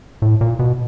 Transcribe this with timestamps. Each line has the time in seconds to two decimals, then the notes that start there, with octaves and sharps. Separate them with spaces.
0.22 A2
0.41 A#2
0.59 B2